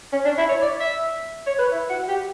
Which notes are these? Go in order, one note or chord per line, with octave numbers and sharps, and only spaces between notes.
C#4
D4
E4
C#5
D5
E5
C#5
B4
E4
F#4
G4